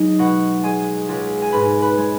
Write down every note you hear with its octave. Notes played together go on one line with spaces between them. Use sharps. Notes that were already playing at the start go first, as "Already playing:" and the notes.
Already playing: F#3 G#3 D#4 D#5
B2 F#4 F#5
G#3 G#4 G#5
C#2
G#5
G#2 B4 B5
B4 B5
G#3